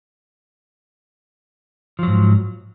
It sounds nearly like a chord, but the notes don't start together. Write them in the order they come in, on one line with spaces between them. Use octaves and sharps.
F3 F#3 G#2